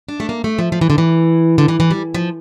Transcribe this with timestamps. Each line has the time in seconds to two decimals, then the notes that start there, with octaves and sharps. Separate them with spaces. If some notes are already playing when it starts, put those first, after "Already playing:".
0.08 D4
0.20 A3
0.29 A#3
0.44 A3
0.59 F3
0.72 F3
0.81 E3
0.90 D3
0.98 E3
1.58 D3
1.68 E3
1.80 E3
1.91 G3
2.14 F3